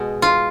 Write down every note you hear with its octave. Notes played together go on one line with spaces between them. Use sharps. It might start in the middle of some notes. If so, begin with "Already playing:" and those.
Already playing: B2 G#3
F4